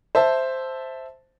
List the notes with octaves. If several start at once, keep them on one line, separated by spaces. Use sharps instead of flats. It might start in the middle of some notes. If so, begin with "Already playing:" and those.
C5 E5 A5